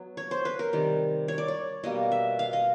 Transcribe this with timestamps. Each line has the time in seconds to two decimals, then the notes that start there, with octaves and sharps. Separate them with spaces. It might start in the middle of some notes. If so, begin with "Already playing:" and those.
Already playing: F#3 B3
0.17 C#5
0.31 C5
0.45 B4
0.59 A#4
0.73 C3 D#3 G3
1.28 C#5
1.38 D5
1.48 C#5
1.84 B2 G3 A#3 D#5
2.12 E5
2.39 F5
2.53 D#5